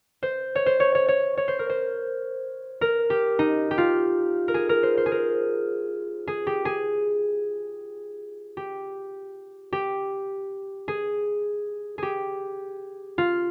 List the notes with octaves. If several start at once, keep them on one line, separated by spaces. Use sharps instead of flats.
C5
C#5
C5
C#5
C#5
C#5
C#5
C5
A#4
C5
A#4
G4
D#4
G4
F4
A#4
G#4
A#4
C5
C5
G#4
A#4
G#4
G4
G#4
G4
G4
G#4
G4 G#4
F4